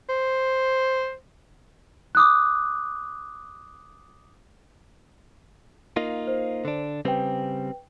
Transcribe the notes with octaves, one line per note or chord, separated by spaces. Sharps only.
C5
D6 D#6 F#6
A#3 D#4 F4
C5
D3 D4
C#3 G3 C4 B4 G5